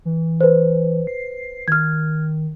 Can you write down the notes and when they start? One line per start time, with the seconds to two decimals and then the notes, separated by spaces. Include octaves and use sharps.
0.05 E3
0.41 B4 C5
1.07 C7
1.68 D#3 F6 G#6